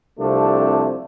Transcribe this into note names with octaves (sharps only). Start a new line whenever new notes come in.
C2 C3 F3 A3 D4